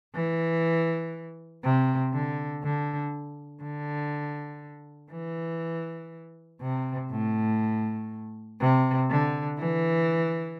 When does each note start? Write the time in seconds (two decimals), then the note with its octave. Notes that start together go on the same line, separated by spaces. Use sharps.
0.15 E3
1.64 C3
2.13 D3
2.64 D3
3.63 D3
5.12 E3
6.62 C3
7.11 A2
8.60 C3
9.10 D3
9.59 E3